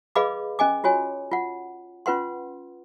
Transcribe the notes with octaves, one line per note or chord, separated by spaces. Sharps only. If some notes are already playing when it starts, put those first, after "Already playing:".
G#4 B4 D#5 F5 B5 D6
C#4 D#5 G#5 D6
F4 F#4 C#5 G#5
F4 F#5
C#4 F4 B4 F#5 C6